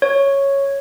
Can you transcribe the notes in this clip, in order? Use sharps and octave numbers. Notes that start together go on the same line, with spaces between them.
C#5